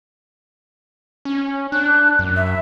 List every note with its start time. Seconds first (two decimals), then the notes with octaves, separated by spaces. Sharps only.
1.25 C#4
1.72 D4 F#6
2.19 F#2
2.36 E5